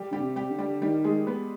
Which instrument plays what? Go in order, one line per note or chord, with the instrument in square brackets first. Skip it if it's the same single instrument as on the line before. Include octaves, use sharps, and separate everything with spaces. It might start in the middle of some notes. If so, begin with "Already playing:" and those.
Already playing: [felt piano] G3 G4
[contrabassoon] D3 [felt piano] G3 G4
[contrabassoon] C3
[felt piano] G3 G4
[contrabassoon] D3
[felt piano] G3 G4
[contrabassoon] D#3 [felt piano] G3 G4
[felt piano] G#3 G#4
B3 B4